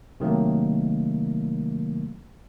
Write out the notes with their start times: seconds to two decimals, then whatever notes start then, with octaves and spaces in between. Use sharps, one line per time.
0.20 C3 D#3 F#3 A3 A#3